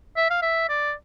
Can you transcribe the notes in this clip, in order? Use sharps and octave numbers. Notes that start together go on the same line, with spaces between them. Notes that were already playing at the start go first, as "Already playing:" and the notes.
E5
F5
E5
D5